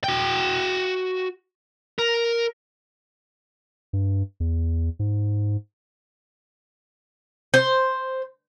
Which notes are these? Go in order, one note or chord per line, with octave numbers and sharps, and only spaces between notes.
F#4 G5
A#4
G2
E2
G#2
C5